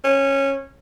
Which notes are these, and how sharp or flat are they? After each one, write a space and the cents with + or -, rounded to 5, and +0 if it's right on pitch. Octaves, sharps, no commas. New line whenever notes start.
C#4 -15